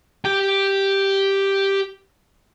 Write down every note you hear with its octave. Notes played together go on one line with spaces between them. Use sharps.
G4 G5